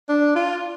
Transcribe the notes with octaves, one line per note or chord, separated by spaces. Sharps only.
D4
F4